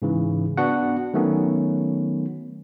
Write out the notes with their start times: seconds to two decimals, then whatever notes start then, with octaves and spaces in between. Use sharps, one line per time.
0.02 G#2 C#3 E3
0.57 B3 D4 F#4 F#5
1.14 D#3 F#3 A3 B3 C#4